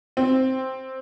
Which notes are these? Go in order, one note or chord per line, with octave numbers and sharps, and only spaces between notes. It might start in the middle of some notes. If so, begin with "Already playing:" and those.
C4